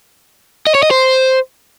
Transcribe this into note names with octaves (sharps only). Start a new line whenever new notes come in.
D#5
C#5
D#5
C5